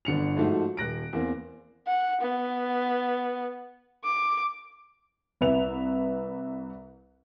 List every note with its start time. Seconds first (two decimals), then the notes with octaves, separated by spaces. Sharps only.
0.05 G1 D3 C#7 F7
0.37 G#2 F3 A3 D#4 F#4
0.77 D#1 F#6 A#6 D7
1.13 E2 A#3 C4
1.87 F#5
2.21 B3
4.04 D6
5.41 C2 B4 E5 F7